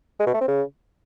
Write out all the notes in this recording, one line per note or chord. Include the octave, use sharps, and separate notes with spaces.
G#3
B2
A3
C4
C#3